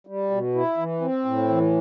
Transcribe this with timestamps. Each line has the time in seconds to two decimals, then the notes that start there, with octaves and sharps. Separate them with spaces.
0.07 G3
0.30 B2
0.55 E4
0.77 E3
1.01 C4
1.25 A2
1.48 E3